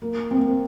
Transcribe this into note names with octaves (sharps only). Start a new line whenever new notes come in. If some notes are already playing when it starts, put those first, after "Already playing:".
A#3
C4
A#3